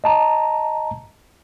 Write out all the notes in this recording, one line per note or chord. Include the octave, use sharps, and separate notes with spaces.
D#5 A5 A#5